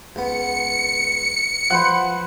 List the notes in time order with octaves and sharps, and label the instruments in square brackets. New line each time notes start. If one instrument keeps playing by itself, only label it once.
[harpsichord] C#2 B3 [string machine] C#7
[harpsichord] F3 [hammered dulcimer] B4 C5 F#5